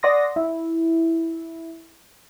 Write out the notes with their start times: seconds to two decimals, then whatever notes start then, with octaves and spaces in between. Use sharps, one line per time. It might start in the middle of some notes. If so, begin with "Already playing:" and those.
0.03 D5 F#5 C6 D#6 A#6
0.36 E4